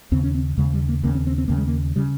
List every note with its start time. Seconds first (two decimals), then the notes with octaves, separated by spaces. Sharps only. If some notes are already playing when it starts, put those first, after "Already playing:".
0.12 D#2 C#3 C4
0.23 C#4
0.35 C4
0.57 D#2 C#3 G#3
0.73 G3
0.88 A#3
1.03 D#2 C#3 A#3
1.15 C4
1.27 C4
1.38 C4
1.48 D#2 C#3 A#3
1.57 G#3
1.67 A#3
1.96 C#3 G3